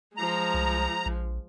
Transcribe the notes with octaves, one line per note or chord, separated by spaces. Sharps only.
F3 G#3 A#5
C2
A#1